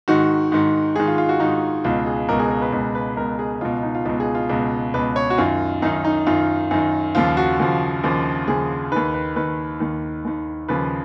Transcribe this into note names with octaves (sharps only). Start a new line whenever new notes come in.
G#2 D#3 F#4
G#2 D#3
G#2 D#3 G#4
F4
F4
F#4
G#2 D#3 D#4
C#2 B2 F4
G#4
C#2 B2 A#4
G#4
A#4
B4
C#2 B2
B4
C#2 B2 A#4
G#4
C#2 B2 F4
D#4
F4
C#2 B2 F4
G#4
F4
C#2 B2
C#2 B2 B4
C#5
F#4
F#2 D#3 F4
F#2 D#3 D#4
D#4
F#2 D#3 F4
F#2 D#3
D#2 C#3 F3 F4
F#4
D#2 C#3 F3
D#2 C#3 F3
D#2 C#3 F3 G#4
D#2 D#3 B4
B4
D#2 D#3 B4
D#2 D#3
D#2 D#3
D#2 C#3 F3 B4